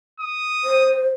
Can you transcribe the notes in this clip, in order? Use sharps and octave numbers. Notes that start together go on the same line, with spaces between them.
D#6
C5